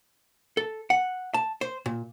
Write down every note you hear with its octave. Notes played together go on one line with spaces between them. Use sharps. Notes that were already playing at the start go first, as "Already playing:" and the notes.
A4
F#5
A5
C5
A#2